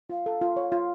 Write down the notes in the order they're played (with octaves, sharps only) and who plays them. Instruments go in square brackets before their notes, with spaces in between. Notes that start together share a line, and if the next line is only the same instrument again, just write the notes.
[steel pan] F4 [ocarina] F5
[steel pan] A4
F4
C#5
F4